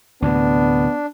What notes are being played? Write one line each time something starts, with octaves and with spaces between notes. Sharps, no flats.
D2 A2 C3 B3 D4